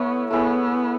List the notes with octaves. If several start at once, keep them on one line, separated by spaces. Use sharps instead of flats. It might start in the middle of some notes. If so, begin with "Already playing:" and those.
Already playing: A3 B3 E4 C#5
A3 B3 E4 G#4 C#5